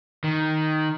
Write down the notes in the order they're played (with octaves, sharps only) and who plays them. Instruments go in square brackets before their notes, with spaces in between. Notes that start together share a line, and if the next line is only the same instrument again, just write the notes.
[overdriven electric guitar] D#3